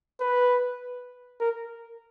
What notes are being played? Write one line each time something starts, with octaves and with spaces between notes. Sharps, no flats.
B4
A#4